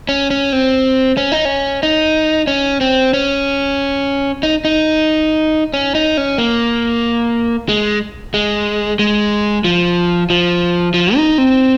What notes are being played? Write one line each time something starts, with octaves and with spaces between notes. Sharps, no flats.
C#4
C#4
C4
C#4
D#4
C#4
D#4
C#4
C4
C#4
D#4
D#4
C#4
D#4
C#4
A#3
G#3
G#3
G#3
F3
F3
F3
D#4
C4